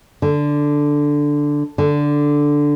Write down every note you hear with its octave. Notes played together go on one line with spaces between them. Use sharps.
D3
D3